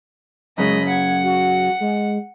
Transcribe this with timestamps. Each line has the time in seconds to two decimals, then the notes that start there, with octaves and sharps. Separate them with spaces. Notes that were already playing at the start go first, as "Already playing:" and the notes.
0.58 F#2 C#3 G#3 D#5 B5
0.88 F#5 G#6
1.24 F#4
1.81 G#3